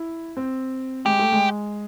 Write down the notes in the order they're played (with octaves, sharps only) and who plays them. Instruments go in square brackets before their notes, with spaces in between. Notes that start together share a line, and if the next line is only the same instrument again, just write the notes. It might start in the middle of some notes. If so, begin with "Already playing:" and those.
Already playing: [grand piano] E4
C4
[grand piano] G#3 [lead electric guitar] G4
[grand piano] A3
G#3